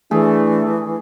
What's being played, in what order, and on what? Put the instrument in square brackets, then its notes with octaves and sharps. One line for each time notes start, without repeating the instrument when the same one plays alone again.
[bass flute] E3 [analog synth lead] A3 [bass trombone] D4 [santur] G#4